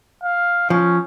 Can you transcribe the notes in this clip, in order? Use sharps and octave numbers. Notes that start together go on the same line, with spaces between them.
F5
F3 C#4